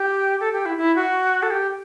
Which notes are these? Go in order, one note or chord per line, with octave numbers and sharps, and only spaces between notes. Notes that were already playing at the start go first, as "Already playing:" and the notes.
Already playing: G4
A4
G4
E4
E4
F#4
A4
G4